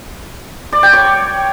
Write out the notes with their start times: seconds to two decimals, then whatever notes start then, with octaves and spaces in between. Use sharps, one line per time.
0.73 D5
0.83 G5
0.93 C#5